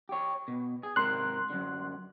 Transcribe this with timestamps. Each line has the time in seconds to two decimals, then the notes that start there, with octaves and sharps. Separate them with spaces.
0.09 G4 C#5
0.48 B2
0.83 G#4
0.96 G#2 C3 A#4 C6 F#6
1.50 F#2 D3